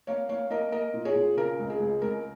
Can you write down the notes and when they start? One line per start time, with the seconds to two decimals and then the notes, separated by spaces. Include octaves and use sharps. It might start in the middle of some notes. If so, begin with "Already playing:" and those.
0.07 A#3 C#5 F5
0.29 A#3 C#5 F5
0.50 A#3 A#4 D#5
0.72 A#3 A#4 D#5
0.94 A#2
1.05 G#4 C#5
1.16 A#2
1.37 C#3 A#4
1.59 C#2
1.70 G#4
1.80 C#2
2.02 C#2 A#4